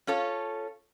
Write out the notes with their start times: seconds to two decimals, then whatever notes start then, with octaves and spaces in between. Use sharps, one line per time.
0.07 C#4 F4 A4 C#5